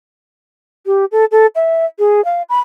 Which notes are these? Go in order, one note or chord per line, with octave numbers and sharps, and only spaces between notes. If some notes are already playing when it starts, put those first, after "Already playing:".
G4
A4
A4
E5
G#4
F5
B5